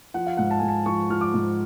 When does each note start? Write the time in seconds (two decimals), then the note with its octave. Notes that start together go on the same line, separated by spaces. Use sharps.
0.14 F3 F#5
0.27 F5
0.37 G#2 F#5
0.51 A5
0.59 G#2 G#5
0.68 A5
0.86 F3 C#6
1.10 F3 F6
1.21 D6
1.34 G#2